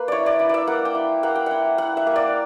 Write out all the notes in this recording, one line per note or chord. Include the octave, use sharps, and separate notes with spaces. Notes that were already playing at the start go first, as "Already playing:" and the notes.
Already playing: A#3 B4
E4 C#5 D5
D5
E4
D5 E5
A#3 F#5
G5
E4
A#3 F#5
G5
E4 F#5
E4 F#5
E5
A#3
D5